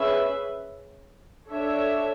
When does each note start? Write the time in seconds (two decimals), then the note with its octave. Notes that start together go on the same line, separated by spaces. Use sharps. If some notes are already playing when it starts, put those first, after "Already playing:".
Already playing: C#4 G#4 B4 E5
1.49 D4 A4 C#5 E5